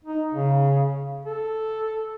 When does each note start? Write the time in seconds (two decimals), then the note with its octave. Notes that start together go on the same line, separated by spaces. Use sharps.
0.04 D#4
0.34 C#3
1.25 A4